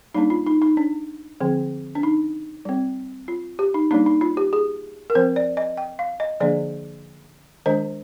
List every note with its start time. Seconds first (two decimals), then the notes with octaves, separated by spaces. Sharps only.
0.14 G3 A#3 D4 D#4
0.30 F4
0.46 D#4
0.62 D#4
0.77 D4
1.40 D3 F3 C4
1.95 D4
2.03 D#4
2.65 G3 C4
3.28 F4
3.59 G4
3.74 D#4
3.91 G3 A#3 D4 D#4
4.06 D#4
4.21 F4
4.37 G4
4.53 G#4
5.10 A#4
5.15 F3 C4 C5
5.36 D5
5.57 D#5
5.77 G5
5.99 F5
6.20 D#5
6.40 D3 F3 A#3 D4 D5
7.66 D#3 G#3 D4 C5